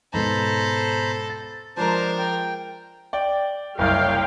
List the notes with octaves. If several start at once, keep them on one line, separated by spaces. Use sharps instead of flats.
G#2 B2 A4 C5 A#5 B5
A6
F3 G#3 D4 A#4 C5 A5 A#5
G5
D5 G5
F#1 C2 C#5 F5 G5